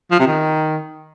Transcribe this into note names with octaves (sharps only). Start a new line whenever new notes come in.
F3
C3
D#3